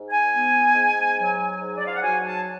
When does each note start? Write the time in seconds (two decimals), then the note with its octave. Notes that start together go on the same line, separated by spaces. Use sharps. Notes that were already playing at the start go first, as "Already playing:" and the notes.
Already playing: G#2
0.11 G#5
0.32 B3
0.74 G#2
1.18 F#3
1.61 G#2
1.78 D5
1.86 F5
1.95 F#5
2.03 F#3 G#5
2.26 A5